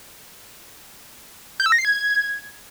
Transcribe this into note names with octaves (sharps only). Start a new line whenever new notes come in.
G6
E6
A#6
C7
G#6